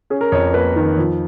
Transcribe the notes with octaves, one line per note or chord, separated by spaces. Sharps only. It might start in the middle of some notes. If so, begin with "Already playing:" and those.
C#4 G#4
A#4
F2 C#5
A#3 B4
D#3
F3